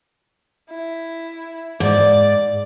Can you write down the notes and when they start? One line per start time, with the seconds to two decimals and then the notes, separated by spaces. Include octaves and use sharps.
0.70 E4
1.80 G#2 D5